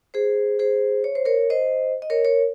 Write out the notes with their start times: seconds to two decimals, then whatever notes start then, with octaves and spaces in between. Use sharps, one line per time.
0.14 G#4 C5
0.59 G#4 C5
1.04 C#5
1.15 C5
1.25 A#4 C#5
1.50 C5 D#5
2.02 D#5
2.10 A#4 C#5
2.25 A#4 C#5